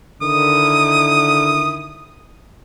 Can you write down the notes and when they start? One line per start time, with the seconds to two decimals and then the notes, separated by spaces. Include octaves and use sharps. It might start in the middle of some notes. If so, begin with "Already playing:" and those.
0.22 D3 D#3 E4 D#6